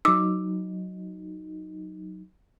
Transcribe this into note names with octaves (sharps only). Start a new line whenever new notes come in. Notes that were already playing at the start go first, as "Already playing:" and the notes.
F#3 D#4 D6 E6